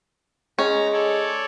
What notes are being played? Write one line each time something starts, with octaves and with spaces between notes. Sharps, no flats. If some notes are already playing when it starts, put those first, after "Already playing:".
G#3 C#4 A#5
A4 C#5 D5